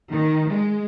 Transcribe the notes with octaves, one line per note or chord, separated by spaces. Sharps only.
D#3
G#3